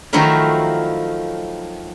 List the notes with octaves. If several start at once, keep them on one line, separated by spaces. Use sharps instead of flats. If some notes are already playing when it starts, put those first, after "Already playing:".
D#3 F3 F#3 A3 E4 A#4